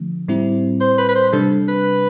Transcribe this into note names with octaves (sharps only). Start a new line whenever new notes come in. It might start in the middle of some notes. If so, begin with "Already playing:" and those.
Already playing: D3 F3 A3
A2 G3 C4 E4
C5
B4
B4
C5
C3 G3 D4 A4
B4